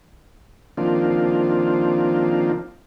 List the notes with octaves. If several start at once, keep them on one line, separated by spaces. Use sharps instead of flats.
D#3 F3 A#3 C4 D4 F4